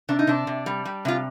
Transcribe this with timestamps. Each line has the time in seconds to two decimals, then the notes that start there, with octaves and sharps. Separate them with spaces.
0.09 C3 D4
0.19 D#4
0.27 C3 D4
0.47 C3
0.66 G3
0.85 G3
1.05 C3 F4